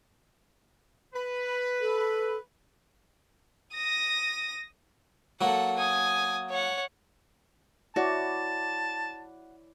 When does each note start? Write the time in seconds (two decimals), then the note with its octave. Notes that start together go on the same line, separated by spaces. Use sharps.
1.14 B4
1.81 A4
3.75 D#6 A#6
5.41 F#3 A#3 A4 F#5
5.77 G#5 D#6
6.50 C#5 F#5
7.96 E4 F#4 C#5 D5 A5